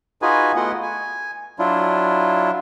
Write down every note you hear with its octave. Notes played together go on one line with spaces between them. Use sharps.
D#4 F4 F#4 G#4 B4 G#5
A3 B3 E4 F4 D#5 F#5
G#5
F#3 D4 E4 F4